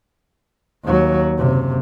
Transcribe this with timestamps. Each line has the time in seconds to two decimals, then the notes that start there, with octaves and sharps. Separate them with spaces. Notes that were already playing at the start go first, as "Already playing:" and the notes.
0.85 D#2 F#3
1.38 F#1 C3